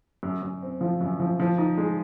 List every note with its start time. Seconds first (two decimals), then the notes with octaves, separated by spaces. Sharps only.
0.23 F#2
0.42 F#2
0.62 C4
0.81 F3
1.01 F#2
1.20 F3
1.40 F3
1.58 D#4
1.78 G#3